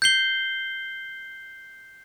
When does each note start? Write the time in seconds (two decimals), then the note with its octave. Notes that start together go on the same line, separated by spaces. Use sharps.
0.02 G6 C7 G7